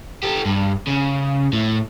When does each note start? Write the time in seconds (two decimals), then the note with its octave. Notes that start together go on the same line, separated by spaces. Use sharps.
0.23 G4 A4
0.46 G2
0.87 C#3
1.53 A2